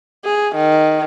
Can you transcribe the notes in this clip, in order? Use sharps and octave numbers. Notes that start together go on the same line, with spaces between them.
G#4
D#3